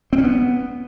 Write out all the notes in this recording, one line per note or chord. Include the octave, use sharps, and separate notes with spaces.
C4
C#4
B3